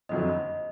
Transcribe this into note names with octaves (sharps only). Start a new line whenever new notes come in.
F#1 F2 D3 F#3 D#5